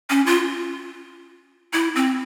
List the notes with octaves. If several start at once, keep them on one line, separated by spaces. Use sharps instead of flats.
C#4
F4
E4
C4